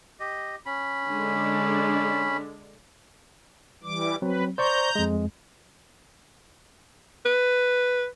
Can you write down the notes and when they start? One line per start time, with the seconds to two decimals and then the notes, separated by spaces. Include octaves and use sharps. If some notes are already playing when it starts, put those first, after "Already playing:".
0.20 G4 D#5
0.66 C#4 B5
1.09 D3 G#3 D4
3.83 E3 G3 D6
4.22 F#3 C4 B4
4.58 C5 D5 A#5 C#6 G6
4.95 F2 G#3
7.26 B4